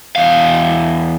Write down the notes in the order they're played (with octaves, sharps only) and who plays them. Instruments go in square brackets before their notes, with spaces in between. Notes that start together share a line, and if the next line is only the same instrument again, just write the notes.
[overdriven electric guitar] E2 F5